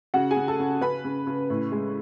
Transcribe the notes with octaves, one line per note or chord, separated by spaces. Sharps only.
C#3 F#4 F#5
G#4 G#5
C#3
A4 A5
C#3
C#3 B4 B5
C#3
C#3
A2
G#3